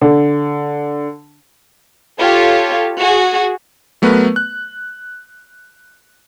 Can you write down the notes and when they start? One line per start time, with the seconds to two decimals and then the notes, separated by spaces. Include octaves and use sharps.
0.01 D3
2.18 F4 G4 A4 C#5
2.99 F#4 G#4
4.02 F#3 A3 B3 A#4 B4
4.36 F#6